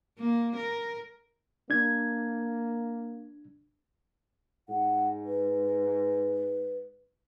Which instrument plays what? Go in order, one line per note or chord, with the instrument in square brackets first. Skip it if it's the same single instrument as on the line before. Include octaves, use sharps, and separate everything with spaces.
[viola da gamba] A#3
A#4
[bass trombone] A#3 [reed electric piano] D4 G#6
[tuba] G#2 [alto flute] F#5
[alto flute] B4